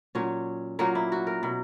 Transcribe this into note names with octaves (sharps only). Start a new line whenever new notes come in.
A#2 F#3 C#4
A#2 F#3 A#3
E4
F#4
A#4
B2 F#3